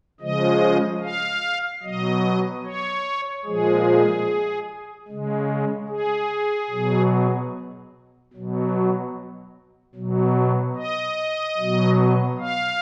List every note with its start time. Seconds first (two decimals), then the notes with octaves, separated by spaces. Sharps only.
0.21 C#3 F3 G#3 D#5
1.02 F5
1.83 B2 F#3 D#5
2.64 C#5
3.45 A#2 F3 G#3 G#4
5.08 C#3 G#3
5.89 G#4
6.70 B2 F#3
8.33 B2 F#3
9.95 B2 F#3
10.76 D#5
11.57 B2 F#3
12.39 F5